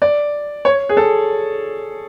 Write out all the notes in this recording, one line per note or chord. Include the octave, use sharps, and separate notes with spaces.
D5
C#5
G#4
A4